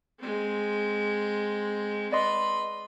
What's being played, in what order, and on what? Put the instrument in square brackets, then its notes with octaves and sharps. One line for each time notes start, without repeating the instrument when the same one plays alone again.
[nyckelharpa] G#3 C4
[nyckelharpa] B4 B5 [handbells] D5 D#5 C6